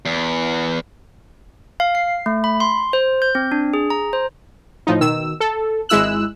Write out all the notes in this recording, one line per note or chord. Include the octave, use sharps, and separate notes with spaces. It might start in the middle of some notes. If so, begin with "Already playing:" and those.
E2
F5
C7
A3
B5
C6
C5
G6
C4
D4
G#4
A#5
C5
A2 F3 D#4
B2 D#3 E6
A4
G#1 G#3 E4 E6 F#6